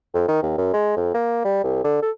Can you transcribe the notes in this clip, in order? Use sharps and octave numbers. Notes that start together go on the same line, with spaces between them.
F2
D#3
D#2
F#2
G#3
F2
A#3
G3
C2
D3
A4